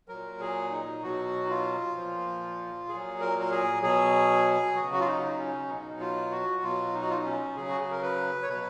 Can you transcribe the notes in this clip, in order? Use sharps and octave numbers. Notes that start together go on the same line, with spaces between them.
A#2 F#3 A#4
G#4
D#4
B2 F#3 F#4
D#4
F4
A#2 F3
A#2 G#4
F#3
A#4
A#4
G#4
B2 F#3 G#4
C#3 F#3 F#4
F#4
F4
D#4
C#4
B2 F#3 D#4
F4
F#4
B2 F#3 F4
D#4
F#4
F4
D#4
C#4
C#3 F#3 G#4
F#4
G#4
A#4
B4
C#5
B2 F#3 B4